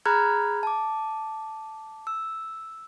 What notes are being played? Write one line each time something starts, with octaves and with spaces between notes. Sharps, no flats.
G#4 A#5 B5 F6 F#6 G#6
A5 D6
E6